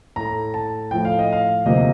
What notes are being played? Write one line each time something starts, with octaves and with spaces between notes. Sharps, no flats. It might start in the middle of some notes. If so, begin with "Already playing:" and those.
A2 A3 A#5
A5
A2 F3 A3 G5
F5
D#5
F5
D2 C3 F3 A#3 D#5